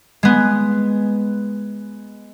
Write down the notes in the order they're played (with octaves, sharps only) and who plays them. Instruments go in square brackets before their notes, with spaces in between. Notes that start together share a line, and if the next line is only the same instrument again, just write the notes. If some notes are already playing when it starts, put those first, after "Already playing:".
[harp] G#3 B3